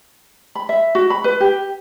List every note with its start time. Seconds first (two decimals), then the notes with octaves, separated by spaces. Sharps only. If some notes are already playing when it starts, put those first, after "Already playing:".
0.55 B5
0.69 E5
0.95 F#4
1.10 B5
1.24 B4
1.40 G4